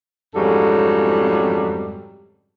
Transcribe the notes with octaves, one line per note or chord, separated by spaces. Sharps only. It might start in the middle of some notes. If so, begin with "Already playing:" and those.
F2 G#2 C#3 F#3 G3 A4